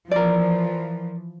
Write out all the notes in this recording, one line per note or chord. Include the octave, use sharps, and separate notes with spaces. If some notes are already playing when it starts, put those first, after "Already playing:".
E3 F3 A#4 D5